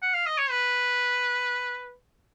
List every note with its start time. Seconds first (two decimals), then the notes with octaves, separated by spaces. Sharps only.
0.02 F#5
0.14 F5
0.26 D#5
0.38 C#5
0.50 B4